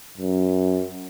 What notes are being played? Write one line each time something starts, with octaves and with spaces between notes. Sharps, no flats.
F#2